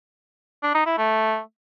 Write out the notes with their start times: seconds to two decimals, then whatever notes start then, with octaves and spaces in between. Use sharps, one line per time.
0.63 D4
0.74 D#4
0.86 E4
0.98 A3